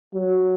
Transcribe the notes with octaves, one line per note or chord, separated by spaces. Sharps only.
F#3